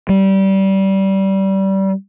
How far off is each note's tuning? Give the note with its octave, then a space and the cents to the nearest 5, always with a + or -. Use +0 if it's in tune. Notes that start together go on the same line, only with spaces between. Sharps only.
G3 -20